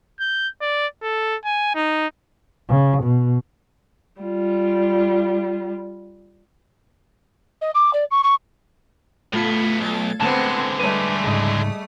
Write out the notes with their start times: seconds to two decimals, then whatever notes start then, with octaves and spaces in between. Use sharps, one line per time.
0.20 G6
0.62 D5
1.03 A4
1.45 G#5
1.75 D#4
2.69 C#3
3.03 B2
4.22 G3 F4
7.61 D#5
7.75 D6
7.93 D5
8.11 C#6
8.23 C#6
9.33 A2 A3 B3 F4 G#6
9.81 B1 A6
10.21 D3 G#3 B3 C4 C5 A5
10.79 G3 A3 B4
11.24 C#2 G#2 G#4 D#5